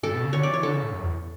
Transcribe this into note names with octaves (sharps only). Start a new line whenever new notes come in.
G2 A4
B2
C#3
D3 C#5
E3 D5
C#5
D3 A4
C#3
A2
F#2
E2